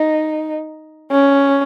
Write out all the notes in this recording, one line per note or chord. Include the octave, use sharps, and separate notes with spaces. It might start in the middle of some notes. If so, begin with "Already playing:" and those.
Already playing: D#4
C#4